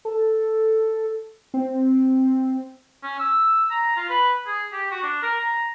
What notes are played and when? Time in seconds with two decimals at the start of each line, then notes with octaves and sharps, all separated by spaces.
0.05 A4
1.54 C4
3.03 C#4
3.19 E6
3.71 A#5
3.97 F4
4.09 B4
4.46 G#4
4.73 G4
4.91 F#4
5.03 D4
5.23 A#4
5.40 A#5